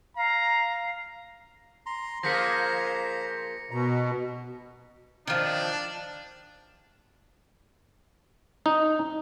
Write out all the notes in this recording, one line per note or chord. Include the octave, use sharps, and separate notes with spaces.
F5 A#5
A#5 C6
F3 A#3 G#4 C5 A#5 A#6 B6 C#7
B2 A#5
D#3 F3 D4
D#4